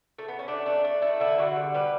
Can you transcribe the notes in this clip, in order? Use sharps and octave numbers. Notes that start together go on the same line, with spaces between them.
A3
B3
C#4
A3 D4
A3 D4
A3 D4
A3 E4
D3 E4
D3 F#4
G3
G3 B4